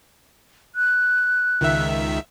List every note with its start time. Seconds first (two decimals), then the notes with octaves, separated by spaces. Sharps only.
0.75 F#6
1.61 C#2 D#3 E5